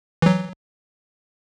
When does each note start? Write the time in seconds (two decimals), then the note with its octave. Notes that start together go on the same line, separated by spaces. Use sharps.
0.22 E3 F#3